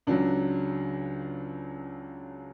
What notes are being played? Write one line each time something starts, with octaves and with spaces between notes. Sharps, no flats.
C#2 C#3 F#3 D4